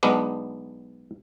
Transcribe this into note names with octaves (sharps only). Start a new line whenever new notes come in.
B1 G#3 B3 D4